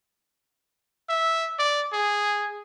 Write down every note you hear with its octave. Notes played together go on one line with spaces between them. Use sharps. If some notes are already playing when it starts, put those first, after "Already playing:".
E5
D5
G#4